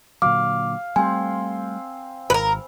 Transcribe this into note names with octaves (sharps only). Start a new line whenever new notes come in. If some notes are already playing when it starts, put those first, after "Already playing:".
A#2 D3 F#3 F5 D6
G3 A3 C4 G#5 C6
G#1 A#4 B4